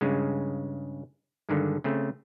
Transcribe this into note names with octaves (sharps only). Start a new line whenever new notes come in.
G2 C#3 G#3
G2 D3 D#3 G#3
C#3 A3 C4